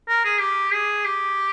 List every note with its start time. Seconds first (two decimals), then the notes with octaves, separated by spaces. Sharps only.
0.08 A#4
0.24 G#4
0.40 G4
0.72 G#4
1.05 G4